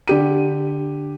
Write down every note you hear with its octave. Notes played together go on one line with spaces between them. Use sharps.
D3 G4 D#7